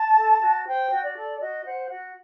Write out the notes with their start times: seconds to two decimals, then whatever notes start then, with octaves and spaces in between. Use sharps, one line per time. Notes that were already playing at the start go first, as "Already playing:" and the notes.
Already playing: A5
0.16 A4
0.41 F#4
0.66 C5 G5
0.91 F#4
1.04 D5
1.16 A4
1.40 F#4 D#5
1.65 C5 F#5
1.90 F#4 F#5